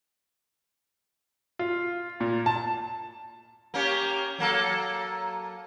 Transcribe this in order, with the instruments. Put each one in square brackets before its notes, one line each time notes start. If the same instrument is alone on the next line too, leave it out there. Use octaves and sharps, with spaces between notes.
[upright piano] F4
A#2
A5
[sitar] A#3 C#4 G4
F#3 A#3 A4